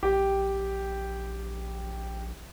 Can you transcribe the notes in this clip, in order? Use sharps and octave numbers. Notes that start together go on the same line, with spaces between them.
A#1 G4 G5